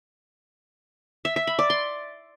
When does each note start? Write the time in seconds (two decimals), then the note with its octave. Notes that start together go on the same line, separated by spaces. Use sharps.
1.25 E5
1.36 E5
1.47 B5
1.59 D5
1.70 C6